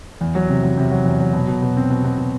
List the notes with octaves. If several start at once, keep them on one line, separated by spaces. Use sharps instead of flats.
E2
F#3
C3
F#3
C3
F#3
E2
F#3
B2
B2
B2
C4
B2
B2
B2